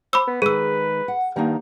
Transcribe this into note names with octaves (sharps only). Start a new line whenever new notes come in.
C5 B5 D6 E6
B3
D#3 G#3 G#4 B4 E6
F#5
G2 D#3 A#3 D#4